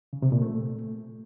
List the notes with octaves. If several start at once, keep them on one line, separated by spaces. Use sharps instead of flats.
C#3
C3
A#2
A3